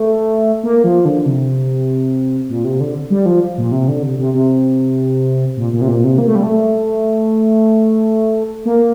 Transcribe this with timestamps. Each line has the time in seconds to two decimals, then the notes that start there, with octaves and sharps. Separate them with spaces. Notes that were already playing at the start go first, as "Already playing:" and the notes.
Already playing: A3
0.63 A#3
0.84 F3
1.05 D3
1.26 C3
2.49 A#2
2.64 C3
2.80 D3
3.10 G3
3.26 F3
3.57 A#2
3.72 C3
3.88 D3
4.03 C3
4.19 C3
4.34 C3
5.57 A#2
5.73 A#2
5.81 C3
5.88 A#2
6.04 C3
6.18 A#3
6.27 A3
6.35 G3
6.43 A3
8.65 A#3